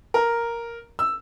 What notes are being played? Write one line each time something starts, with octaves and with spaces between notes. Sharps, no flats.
A#4
E6